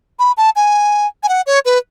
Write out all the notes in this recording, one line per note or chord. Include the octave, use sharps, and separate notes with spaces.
B5
A5
G#5
G#5
F#5
C#5
B4